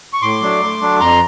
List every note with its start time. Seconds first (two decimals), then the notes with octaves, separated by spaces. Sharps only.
0.13 C#6
0.22 A2 C6 D6
0.41 F#3 A3 D4
0.61 A2
0.81 F#3 A3 D4
1.00 F2 A#5 C6